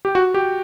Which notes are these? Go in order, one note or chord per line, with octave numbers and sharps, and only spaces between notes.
G4
F#4
G4